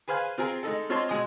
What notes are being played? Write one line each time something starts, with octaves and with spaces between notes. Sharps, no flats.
G#4 B4 C5 F5 G#5
C4 F4 G#4 A#4
G#3 D#4 A4
C4 F4 C#5 D#5 A5 C6
B2 G#3 G#5 D#6